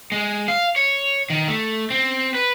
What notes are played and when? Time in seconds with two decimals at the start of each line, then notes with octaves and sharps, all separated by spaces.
0.12 G#3
0.48 F5
0.76 C#5
1.30 D#3
1.48 A3
1.90 C4
2.34 B4